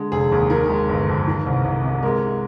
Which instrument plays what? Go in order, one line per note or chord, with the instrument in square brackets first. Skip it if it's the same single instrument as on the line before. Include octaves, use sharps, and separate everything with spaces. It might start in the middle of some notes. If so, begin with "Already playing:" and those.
Already playing: [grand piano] D3 G#3
F1 G#4
D#2
D#3 A#4
G#3
G1
F2
D#3
C2
C2
C3
G#3 A#4